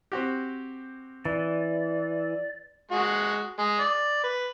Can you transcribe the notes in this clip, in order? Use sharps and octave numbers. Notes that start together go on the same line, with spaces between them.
C4 F#4 G4
E3 D5
G#3 F#4
G#3
D5
B4